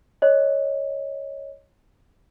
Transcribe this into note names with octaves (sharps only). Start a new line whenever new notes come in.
C#5 D#5